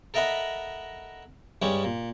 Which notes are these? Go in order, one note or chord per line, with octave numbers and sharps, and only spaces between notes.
A4 A#4 D#5 E5 F#5 B5
G2 G3 G#3 C#4
A#2